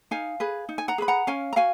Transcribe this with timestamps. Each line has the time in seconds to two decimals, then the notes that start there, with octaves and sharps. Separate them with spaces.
0.11 D#4 F5 G#5
0.40 G#4 B4
0.69 D#4
0.78 G#5
0.88 F#5 A#5
0.98 G#4 B4 B5
1.08 F#5 A#5
1.27 C#4 F5 G#5
1.53 A#5
1.56 F#4 F5 G#5